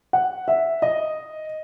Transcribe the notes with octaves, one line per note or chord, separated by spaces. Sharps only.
F#5
E5
D#5